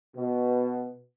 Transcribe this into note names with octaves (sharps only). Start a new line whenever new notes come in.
B2